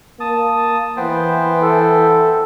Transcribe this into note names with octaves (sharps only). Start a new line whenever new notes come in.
A#3 A5 D#6
E3 B3 C5 G5
A4